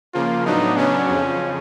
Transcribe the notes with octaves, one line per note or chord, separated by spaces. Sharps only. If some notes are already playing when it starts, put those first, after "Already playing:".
C#3 F3 A#3 F4
A2 F#3 B3 D4 D#4
C#3 F#3 B3 C#4 D4
F2 C#3 F3